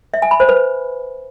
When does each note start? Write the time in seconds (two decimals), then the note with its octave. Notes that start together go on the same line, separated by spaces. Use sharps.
0.14 E5
0.22 G#5
0.31 B5
0.40 C5
0.49 B4